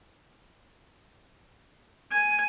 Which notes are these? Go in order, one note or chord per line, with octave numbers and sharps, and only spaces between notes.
G#5